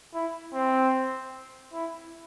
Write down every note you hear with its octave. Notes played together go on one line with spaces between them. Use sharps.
E4
C4
E4